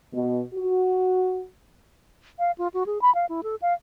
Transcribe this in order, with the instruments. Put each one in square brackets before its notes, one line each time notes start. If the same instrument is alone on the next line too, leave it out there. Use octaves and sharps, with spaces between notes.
[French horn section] B2
F#4
[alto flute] F5
F4
F#4
G#4
B5
F5
E4
A4
F5